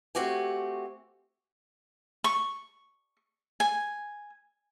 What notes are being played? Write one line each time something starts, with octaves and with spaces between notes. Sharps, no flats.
A3 C4 F#4 G4 G#5
C#6
G#5